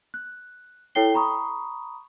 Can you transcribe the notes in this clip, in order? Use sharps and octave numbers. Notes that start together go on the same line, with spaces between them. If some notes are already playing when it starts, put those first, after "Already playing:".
F#6
E4 A4 C#5 G5 C7 G7
A#5 B5 C#6 D#6